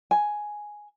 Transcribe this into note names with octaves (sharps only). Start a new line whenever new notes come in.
G#5